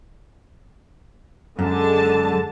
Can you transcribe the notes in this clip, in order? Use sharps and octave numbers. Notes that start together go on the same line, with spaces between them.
F#2 D3 G#3 A5